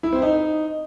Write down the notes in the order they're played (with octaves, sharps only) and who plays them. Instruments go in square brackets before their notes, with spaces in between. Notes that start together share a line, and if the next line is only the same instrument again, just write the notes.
[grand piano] E4
C4
D#4